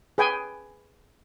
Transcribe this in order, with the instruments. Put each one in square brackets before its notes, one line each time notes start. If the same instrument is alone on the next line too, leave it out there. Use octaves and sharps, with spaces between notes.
[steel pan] G#4 B4 G5 G#5